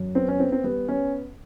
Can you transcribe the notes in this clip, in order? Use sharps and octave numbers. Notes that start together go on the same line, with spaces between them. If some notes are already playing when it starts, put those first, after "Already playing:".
Already playing: F#2
B3 C4
C#4
B3 C4
C4
G3 B3
B3 C#4